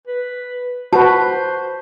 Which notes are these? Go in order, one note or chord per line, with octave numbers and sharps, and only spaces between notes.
B4
F#4 B4 C5 A5